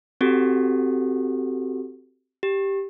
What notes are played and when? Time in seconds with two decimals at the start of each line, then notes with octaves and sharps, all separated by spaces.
0.21 C4 F#4 G4 A4
2.43 G4